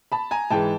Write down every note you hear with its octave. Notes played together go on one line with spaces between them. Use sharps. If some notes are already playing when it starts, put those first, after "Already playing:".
A5 B5
G#5 A#5
G#2 E3 G#3 G5 A5